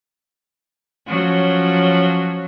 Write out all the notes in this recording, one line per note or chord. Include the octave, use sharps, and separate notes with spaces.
F3 F#3 C#4